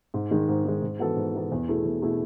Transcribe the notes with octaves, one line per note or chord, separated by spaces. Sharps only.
G#2
D#3 G#3
G#2
D#3 G#3
G#2
E3 B3 F#4 A4
G#2
E3 B3 F#4 A4
E2
B2 A3 E4 G#4
E2
B2 A3 E4 G#4